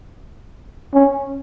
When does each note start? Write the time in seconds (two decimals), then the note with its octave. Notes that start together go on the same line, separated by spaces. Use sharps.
0.94 C#4